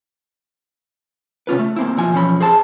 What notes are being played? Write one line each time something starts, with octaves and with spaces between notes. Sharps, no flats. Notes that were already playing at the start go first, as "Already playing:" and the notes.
C3 C#4 F4 B4
A3
A#3 C4 E4
B1 F3 G#5
B1 E2 F3 C#4 B5
G#4 C5 A5